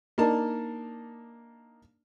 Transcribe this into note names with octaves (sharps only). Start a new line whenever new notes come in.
A#3 D4 D#4 A#4 A5